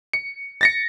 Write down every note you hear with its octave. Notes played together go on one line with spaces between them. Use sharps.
C#7
A6 A#6 C#7